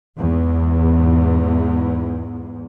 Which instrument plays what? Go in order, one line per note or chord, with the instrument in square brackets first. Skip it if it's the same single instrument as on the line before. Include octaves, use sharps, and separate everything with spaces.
[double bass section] E2 G#2